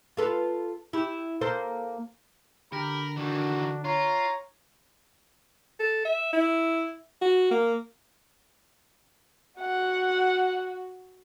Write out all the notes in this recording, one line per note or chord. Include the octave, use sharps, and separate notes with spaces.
F4 A4 B4
E4 G4
A#3 A4 C5
D3 G4 A#4 B5
D#3 E3 D4 F#4
F4 C#5 A#5
A4
E5
E4
F#4
A#3
F#4 F#5